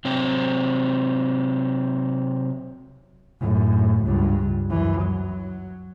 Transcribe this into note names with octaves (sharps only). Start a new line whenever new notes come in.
C3 F#3 C4
F#2 A2
C#2 G2
F#2 E3
F#3